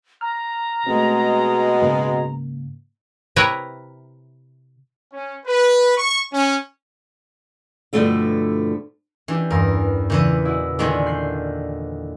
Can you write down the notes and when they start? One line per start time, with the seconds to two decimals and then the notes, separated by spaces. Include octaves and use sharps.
0.21 A#5 F6
0.87 B2 G#3 A3 C4
1.82 G#2 C#3 A#3
3.36 C3 E4 A#4 B4 C#5 A#5
5.13 C#4
5.46 B4
5.98 C#6
6.33 C#4
7.93 G2 B2 D3 F3 A3 E4
9.28 E3 C#4 D4 G4
9.50 E2 G2 A#4
10.10 A#2 C#3 E3 B4 G6
10.45 E4 F#4 D5
10.79 A#2 D3 D#3 G#4 C5 D5
11.06 F#6 G6 C7